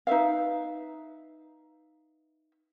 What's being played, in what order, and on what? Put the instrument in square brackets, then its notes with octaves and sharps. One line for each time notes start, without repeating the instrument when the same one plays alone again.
[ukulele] D#4 B4 E5 F5